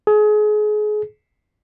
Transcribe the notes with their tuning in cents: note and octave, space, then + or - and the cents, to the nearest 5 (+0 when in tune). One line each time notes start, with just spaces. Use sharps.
G#4 +30